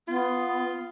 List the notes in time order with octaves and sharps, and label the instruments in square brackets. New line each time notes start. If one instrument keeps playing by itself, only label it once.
[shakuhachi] B3 [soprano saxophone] F4